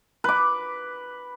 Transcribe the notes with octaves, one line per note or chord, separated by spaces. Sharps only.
B4 D6